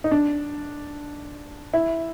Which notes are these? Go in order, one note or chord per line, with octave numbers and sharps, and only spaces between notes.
D#4
D4
E4